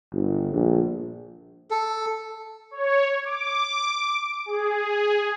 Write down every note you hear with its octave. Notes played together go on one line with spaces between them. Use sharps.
G1
A#1
A4
C#5
D6
G#4